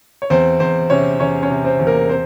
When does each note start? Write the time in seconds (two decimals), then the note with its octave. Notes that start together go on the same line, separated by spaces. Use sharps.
0.22 C#5
0.30 E2 C4 C5
0.60 E2 C4 C5
0.90 C3 C#4 C#5
1.20 E2 C#4 C#5
1.43 C#4 C#5
1.50 C3
1.65 C4 C5
1.79 E2
1.87 A#3 A#4
2.09 C4 C5